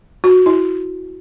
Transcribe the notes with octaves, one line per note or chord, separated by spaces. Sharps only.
F#4
E4